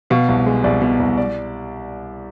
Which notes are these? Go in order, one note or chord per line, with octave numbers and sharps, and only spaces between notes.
B2 F5
C2
G#3
C2 D5
B2
C2
D5